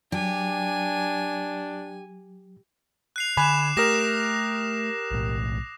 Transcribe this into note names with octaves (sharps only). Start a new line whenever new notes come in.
F#3 D4 G4 G#5
F#6 C7 F7
D3 G#5 B5 D6 F#6 E7
A3 G4 A#4 D#6 A#6 E7
B1 A2